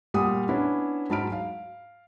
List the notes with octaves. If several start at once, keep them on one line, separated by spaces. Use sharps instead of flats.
A#2 G3 F#5 D#6
B3 C#4 D4 E4
G#2 F#3 A5 B5 F6 D7
F5